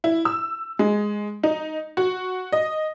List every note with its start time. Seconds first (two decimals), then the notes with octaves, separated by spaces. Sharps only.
0.04 E4
0.25 E6
0.79 G#3
1.43 D#4
1.97 F#4
2.52 D#5